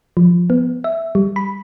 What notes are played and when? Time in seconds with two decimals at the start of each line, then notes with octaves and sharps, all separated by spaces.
0.17 F3
0.50 B3
0.84 E5
1.15 G3
1.36 B5